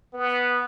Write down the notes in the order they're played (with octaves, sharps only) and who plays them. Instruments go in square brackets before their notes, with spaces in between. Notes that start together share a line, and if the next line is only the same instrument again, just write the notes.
[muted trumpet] B3